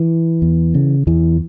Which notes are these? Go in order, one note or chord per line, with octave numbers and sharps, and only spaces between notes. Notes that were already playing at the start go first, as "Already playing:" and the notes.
Already playing: E3
E2
C#3
E2 E3